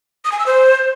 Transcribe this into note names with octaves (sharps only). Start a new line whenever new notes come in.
D#6
G#5
E6
C5